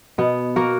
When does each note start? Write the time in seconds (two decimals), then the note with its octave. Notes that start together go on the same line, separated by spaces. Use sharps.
0.18 B2 B3
0.56 A#3 F#4 A#4